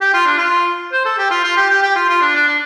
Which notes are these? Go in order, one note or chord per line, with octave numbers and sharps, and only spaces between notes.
G4
F4
D4
F4
C5
A4
G4
F4
F4
G4
G4
G4
F4
F4
D4
D4
D4